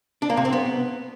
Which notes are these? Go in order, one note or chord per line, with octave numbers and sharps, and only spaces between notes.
D4
A#3
C3
C4
B3